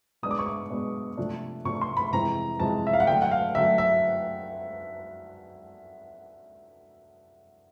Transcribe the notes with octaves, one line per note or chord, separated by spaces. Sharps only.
B2 G#3 B3 D4 D#6
D6
C#6
D6
B2 G#3 B3 D4
C3 F3 A3 D4
C3 F3 A3 D4 C#6
C6
B5
F2 C3 E3 G#3 C4 A#5
F2 C3 E3 G#3 C4 A5
E5
F5
F#5
D3 F#3 A3 G5
F#5
F5
D3 F#3 A3 E5
E5